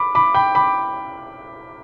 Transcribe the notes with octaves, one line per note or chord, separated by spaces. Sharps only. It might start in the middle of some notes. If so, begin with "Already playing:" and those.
Already playing: B5 D6
B5 D6
G5 B5
B5 D6